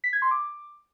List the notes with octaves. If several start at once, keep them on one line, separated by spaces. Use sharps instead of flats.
B6
G#6
C6
D6